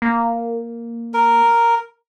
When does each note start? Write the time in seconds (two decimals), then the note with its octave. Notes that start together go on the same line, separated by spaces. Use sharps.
0.02 A#3
1.14 A#4